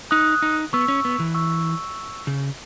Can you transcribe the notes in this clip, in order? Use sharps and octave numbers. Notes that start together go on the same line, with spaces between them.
D#4 D#6 F#6
D#4
B3 C#6 E6
C#4
B3
E3
C#6 E6
C#3